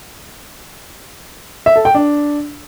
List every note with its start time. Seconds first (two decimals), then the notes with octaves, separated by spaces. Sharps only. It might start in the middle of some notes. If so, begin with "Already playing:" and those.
1.66 E5
1.76 A4
1.85 G5
1.95 D4